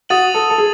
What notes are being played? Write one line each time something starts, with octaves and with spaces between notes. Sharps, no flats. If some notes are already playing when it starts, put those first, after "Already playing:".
F#4 D#6 A6 D#7 F#7
A4
A4
G#4